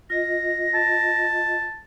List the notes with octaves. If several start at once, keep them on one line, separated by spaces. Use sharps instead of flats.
F4 D#5 A#6
A5